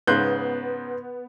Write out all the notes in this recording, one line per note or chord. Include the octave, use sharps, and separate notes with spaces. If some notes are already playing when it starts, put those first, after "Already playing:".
G#2 C#3 B3 C6 F#6 G6